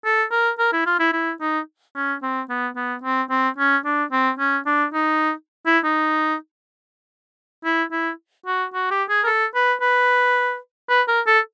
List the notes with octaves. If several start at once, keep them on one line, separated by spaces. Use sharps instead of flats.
A4
A#4
A#4
E4
F4
E4
E4
D#4
C#4
C4
B3
B3
C4
C4
C#4
D4
C4
C#4
D4
D#4
E4
D#4
E4
E4
F#4
F#4
G4
G#4
A#4
A4
B4
B4
B4
A#4
A4